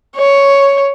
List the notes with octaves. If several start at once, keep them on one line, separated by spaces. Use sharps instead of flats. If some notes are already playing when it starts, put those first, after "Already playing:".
C#5